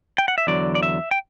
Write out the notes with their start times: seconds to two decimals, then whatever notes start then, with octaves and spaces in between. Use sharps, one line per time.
0.18 G5
0.28 F#5
0.38 E5
0.47 E2 D3 F#3 D5
0.75 D5
0.83 E5
1.11 G5